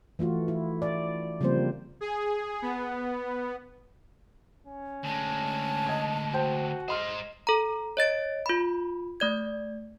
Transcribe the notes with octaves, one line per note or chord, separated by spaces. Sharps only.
E3 A3 F4 F#4
E4
D5
C#3 F3 G3 A#3 C4 C5
G#4
B3
C#4
D2 G#3 A5
D#5 G#6
F#4 C5 G5
G#3 C5 D#5 C6 F6
A4 A#5
C#5 D#5 A6 D7
F4 B5
A3 D5 G#6